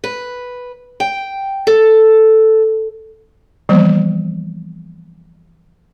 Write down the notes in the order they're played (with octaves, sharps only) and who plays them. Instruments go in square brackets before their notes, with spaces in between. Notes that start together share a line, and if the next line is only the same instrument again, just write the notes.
[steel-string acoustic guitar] B4
G5
A4
[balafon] E3 F3 G3 A#3 B3